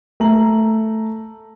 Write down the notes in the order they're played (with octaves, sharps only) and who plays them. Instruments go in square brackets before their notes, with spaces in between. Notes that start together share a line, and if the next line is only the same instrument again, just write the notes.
[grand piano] A3 A#5 F#7